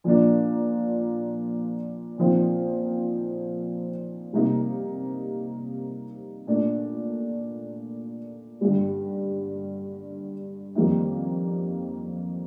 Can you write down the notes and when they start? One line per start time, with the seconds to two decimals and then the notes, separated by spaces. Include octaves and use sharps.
0.04 A#2 F3 A#3 D4
2.18 A#2 F3 C4 D#4
4.33 C3 G3 A#3 D#4
6.47 A#2 A3 D4
8.61 G2 D3 G3
10.75 F2 D#3 G3 A#3 D#4